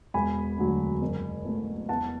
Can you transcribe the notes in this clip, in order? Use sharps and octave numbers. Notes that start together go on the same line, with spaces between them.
E1 G#5 B5
D2 D3 F#3
F#1
E2 B2 A3
E2 F#5 A5